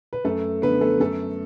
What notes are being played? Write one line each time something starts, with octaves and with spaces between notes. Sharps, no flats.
B4
F#2 A3 A4
D3 B3 B4
A3 A4
F#2 A3 A4